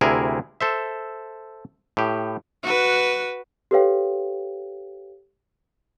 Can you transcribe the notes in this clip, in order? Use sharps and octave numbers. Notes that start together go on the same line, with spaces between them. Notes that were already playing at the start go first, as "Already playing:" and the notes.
D2 C3 E4 G#4 A#4
A4 C5 E5
A2 G4
F#4 B4
G4 A4 B4 C#5 F5 G5